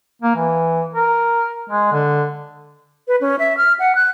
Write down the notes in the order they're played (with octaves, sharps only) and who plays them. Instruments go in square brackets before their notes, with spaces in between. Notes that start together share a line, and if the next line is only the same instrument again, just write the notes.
[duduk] A#3
E3
A#4
G#3
D3
[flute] B4
C#4
E5
F6
F#5
F#6